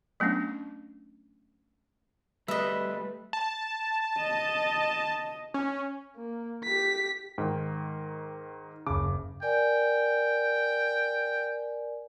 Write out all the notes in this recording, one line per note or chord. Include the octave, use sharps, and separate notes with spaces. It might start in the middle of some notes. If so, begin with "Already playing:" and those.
F#3 A3 B3 C#4 D4
G3 A3 B4 D#5 E5
A5
D#5
C#4
A#3
G4 B6
G#2 D#3 G5
F#1 C#3 D6
A#4 D5 G5 G#5